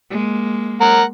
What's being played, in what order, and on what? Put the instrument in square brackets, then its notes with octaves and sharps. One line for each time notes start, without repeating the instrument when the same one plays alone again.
[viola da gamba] G#3 A#3
[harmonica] A#4 F#5